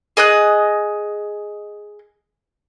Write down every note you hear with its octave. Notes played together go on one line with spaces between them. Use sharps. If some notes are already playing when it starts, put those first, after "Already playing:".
G#4 D#5 D#6 F#6